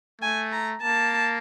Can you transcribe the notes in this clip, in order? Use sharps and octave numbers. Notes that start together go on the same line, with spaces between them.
A3 G#5
A#5
A#3 A5